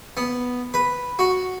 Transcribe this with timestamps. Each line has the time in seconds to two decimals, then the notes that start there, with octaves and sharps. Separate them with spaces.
0.17 B3
0.74 B4
1.19 F#4